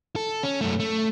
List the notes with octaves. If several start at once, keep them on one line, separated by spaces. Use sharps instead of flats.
A4
C#4
F#2 A3
A3